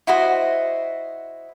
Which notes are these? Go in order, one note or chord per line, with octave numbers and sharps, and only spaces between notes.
E4 F#4 C5 D#5